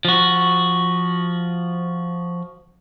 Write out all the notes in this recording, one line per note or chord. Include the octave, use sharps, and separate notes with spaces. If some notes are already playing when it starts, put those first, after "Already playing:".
F3 F#4